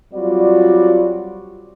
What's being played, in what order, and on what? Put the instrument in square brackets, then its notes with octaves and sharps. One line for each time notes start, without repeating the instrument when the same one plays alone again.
[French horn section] F#3 G3 C4 F4 F#4 D5